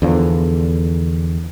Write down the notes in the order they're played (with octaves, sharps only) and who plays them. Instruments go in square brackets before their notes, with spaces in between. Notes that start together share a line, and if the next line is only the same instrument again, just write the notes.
[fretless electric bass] E2 D3 F3